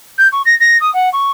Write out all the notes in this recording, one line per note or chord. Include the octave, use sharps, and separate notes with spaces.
G6
C#6
A#6
A#6
D#6
F#5
C#6